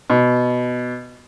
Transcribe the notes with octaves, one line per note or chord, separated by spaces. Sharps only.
B2